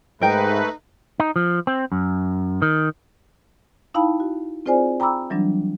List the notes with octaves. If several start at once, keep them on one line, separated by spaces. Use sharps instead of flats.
G#2 A3 D#4 A#4 B4 G5
D#4
F3
C4
F#2
D#3
D#4 E4 F5 G5 A5 B5
F#4
C4 F4 G#4 C5 D5 G#5
G5 A#5 B5 D6 E6
E3 F#3 G3 D4